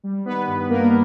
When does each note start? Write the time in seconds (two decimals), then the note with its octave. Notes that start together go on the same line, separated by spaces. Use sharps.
0.04 G3
0.25 D#3 B3 B4
0.47 G2
0.69 G2 A#3 A#4